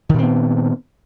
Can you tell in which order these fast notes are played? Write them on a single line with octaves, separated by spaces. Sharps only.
D#3 A#2 C4 B3